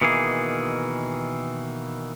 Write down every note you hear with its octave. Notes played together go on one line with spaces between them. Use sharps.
B2 D#3 E3 A#3 G#4